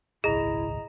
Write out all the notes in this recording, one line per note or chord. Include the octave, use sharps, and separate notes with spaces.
D#1 G#1 C#2 E4 G#4 D#5 A#5